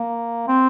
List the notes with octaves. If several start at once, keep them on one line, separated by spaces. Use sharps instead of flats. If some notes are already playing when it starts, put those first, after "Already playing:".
Already playing: A#3
C4